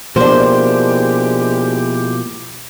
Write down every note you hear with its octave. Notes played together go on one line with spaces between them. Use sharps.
B2 F3 G#3 A#3 D4 E4 G4 C5